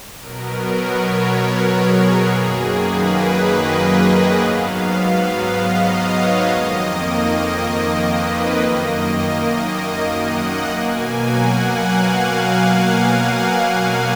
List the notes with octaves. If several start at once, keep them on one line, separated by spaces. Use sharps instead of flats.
B2 F#3 B3 A#4
C#5
A#4
G#4
F#2 D#3 F#3 A#3 G#4
B4
D#5
D#5
G#2 F#3 B3 F5
F5
D#5
C#5
F2 D#3 A#3 D#5
B4
F#2 D#3 A#3 D#5
D#5
F#5
B2 F#3 A#3 G#5
F#5
F5
F#5